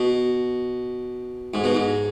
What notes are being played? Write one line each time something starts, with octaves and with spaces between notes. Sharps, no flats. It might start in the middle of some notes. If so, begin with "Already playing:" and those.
Already playing: B2
G#2
B2
G#2